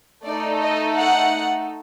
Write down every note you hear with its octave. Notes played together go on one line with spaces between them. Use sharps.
A3 D#4 A4 D5
D#5
F#5